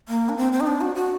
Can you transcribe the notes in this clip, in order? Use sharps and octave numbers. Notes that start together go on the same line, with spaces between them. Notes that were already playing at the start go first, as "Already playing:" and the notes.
A#3
D4
C4
C4
D#4
D4
F#4
F#4